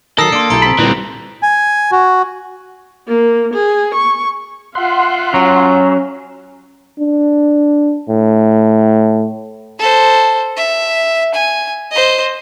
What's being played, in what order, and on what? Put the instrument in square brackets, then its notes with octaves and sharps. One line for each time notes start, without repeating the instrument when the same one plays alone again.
[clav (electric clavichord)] D#3 F#3 [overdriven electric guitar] A4 [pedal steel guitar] A#4 [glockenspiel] D#6 E6 C7
[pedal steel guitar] A#3 [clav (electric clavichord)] D4 [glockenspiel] C6 D7
[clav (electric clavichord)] B1 E4 G4 [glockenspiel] A#5 C6 D7
[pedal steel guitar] C4 B5
[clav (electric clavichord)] A#2 D4 [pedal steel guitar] D3 G3 [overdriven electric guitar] E3 C4
[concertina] G#5
F#4
[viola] A#3
G#4
C#6
[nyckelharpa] F4 E5 [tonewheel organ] F#5 C6
[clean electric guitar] F#3 [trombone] C#4
[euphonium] D4
A2
[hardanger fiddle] A4 C5
E5
G#5
C5 D#5